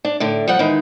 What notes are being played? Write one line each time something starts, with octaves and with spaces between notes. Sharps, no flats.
D4
A2 D3
F3 G3 F#5
D#3 E3 G#3 D#4